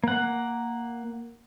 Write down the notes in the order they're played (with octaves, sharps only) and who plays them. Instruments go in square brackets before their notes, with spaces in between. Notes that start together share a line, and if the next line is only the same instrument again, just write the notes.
[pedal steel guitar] A#3 F#5